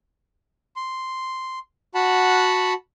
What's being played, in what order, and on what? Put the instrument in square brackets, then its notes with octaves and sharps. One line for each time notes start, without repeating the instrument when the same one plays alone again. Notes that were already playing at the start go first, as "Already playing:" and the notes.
[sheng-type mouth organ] C6
F#4 F#5 A5 B5